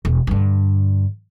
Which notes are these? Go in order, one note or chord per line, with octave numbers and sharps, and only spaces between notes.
E1
G2 D3